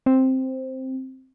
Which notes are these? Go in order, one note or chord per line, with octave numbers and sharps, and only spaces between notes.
C4